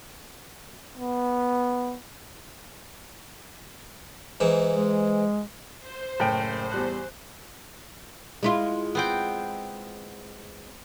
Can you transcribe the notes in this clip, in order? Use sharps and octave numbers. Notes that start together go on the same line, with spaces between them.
B3
G#2 E3
G#3
C5
F#1 A2 G5
E2 G3 F#6
G#3 E4 F4
B3 C4 G5